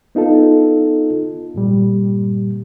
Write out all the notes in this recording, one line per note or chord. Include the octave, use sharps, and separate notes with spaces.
B3 D#4 F4 A4
G2 A#2 G3